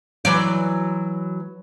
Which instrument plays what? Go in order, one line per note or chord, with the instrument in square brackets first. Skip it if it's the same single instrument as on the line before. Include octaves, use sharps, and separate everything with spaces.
[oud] E3 F#3 D5